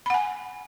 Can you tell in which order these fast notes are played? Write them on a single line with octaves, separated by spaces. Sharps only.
B5 F#5 G#5